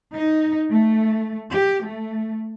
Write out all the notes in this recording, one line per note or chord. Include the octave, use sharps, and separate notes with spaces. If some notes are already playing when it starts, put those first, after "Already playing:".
D#4
A3
G4
A3